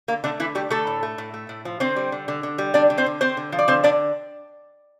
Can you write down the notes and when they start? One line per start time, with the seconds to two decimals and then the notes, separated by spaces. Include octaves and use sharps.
0.08 D3 A#3
0.24 D3 A3 D4
0.40 D3 E3 E4
0.55 G3 A3 G4
0.70 D3 A3 A4
0.87 A2
1.03 A3
1.18 A2
1.34 A3
1.49 A2
1.65 F3
1.80 D3 C4 C5
1.96 G3
2.12 D3
2.28 D3
2.43 D3
2.58 G3
2.74 D3 D4 D5
2.90 D3
2.98 C4 C5
3.06 D3
3.21 D3 C4 C5
3.37 D3
3.52 F3
3.59 D5
3.68 D3 C4 C5
3.84 D3 D4 D5